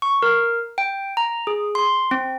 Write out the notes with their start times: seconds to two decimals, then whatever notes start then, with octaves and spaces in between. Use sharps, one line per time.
0.02 C#6
0.22 A#4
0.78 G5
1.17 A#5
1.47 G#4
1.75 C6
2.11 C4